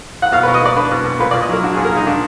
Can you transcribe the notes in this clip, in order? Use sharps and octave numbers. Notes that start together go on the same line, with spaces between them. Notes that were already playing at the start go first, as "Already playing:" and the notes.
F#5
B2 F5
B4
B2
D#5
A#3 D5
D4 B4
B2
B2
A#2 B4
D5
A#2
D#5
F#3 A#4
D4 F#4
A#2 G#4
A#4
A#2 D#4
A#2 D4